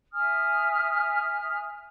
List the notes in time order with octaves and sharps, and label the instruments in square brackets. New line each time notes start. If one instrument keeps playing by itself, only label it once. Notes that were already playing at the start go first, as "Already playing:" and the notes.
[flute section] E5 G#5 D#6 F6